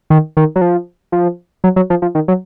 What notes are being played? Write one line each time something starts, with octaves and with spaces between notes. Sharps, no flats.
D#3
D#3
F#3
F3
F3
F#3
F#3
F3
F3
D#3
F#3